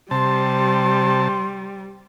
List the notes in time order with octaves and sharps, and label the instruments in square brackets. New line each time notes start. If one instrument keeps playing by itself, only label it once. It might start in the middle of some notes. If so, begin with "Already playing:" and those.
[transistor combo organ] C3 A5 [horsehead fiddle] G3 [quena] C6